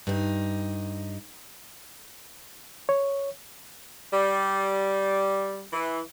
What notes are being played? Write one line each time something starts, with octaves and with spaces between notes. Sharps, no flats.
G2 D#4
C#5
G3
E3